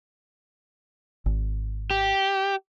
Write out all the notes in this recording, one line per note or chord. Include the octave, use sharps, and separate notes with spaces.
G#1
G4